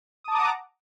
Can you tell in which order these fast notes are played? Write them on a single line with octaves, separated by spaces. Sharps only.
D#6 A5 D6 A#5 F#5